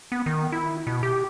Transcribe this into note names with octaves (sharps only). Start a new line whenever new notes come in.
B3
D#3
E4
B2
G4